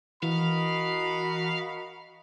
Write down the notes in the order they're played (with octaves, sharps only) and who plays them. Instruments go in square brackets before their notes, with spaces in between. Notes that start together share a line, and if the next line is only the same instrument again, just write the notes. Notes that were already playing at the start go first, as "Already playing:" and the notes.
[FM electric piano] E3 [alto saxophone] F#4 [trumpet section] A#4 D#5 B5 [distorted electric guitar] F5